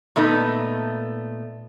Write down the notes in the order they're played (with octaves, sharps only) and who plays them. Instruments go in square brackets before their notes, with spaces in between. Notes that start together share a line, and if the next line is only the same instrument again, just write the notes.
[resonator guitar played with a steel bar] A#2 A3 B3 D#4